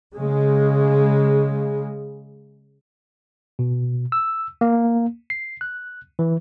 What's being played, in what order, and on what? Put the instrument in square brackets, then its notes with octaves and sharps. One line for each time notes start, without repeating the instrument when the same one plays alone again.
[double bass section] C#3 G#3
[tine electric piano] B2
E6
A#3
C7
F#6
E3